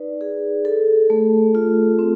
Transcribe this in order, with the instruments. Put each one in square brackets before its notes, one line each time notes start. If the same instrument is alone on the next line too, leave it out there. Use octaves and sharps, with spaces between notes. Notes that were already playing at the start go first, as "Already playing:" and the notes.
Already playing: [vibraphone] D#4 B4 D5
G#4
A4
A3
F4
C4